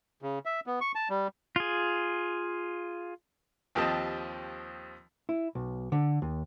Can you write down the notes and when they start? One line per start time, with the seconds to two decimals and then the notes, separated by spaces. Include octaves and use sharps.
0.22 C#3
0.45 E5
0.67 B3
0.81 C#6
0.95 A5
1.10 G3
1.56 F4 G#4
3.75 D#2 F3 C4 G4 D#5 A5
5.29 E4
5.55 B1
5.92 D3
6.22 D#2